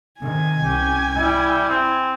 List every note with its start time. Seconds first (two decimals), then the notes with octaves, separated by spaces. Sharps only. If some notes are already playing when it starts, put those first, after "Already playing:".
0.20 C3 D#3 G#5
0.64 C2 C#4 G4
1.16 G3 E4
1.70 C4